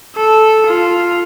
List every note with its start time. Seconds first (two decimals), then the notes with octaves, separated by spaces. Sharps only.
0.16 A4
0.67 F4